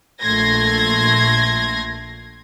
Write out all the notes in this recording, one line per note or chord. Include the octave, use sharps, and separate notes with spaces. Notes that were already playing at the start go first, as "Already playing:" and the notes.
A#1 A3 C6 G#6 A#6